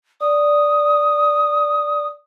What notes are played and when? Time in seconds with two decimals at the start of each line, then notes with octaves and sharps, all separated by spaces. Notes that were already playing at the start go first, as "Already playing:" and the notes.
0.21 D5 D#6